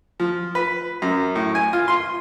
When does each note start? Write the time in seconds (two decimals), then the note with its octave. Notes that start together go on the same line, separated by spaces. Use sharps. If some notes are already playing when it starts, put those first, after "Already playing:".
0.20 F3
0.55 B4
1.02 F#2
1.35 A2
1.55 G#5
1.73 F4
1.88 C6